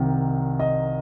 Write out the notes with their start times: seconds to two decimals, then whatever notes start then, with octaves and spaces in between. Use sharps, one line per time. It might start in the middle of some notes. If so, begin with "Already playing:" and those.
Already playing: C2 C3 D#3
0.60 D#5